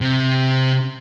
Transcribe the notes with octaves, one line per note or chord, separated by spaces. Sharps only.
C3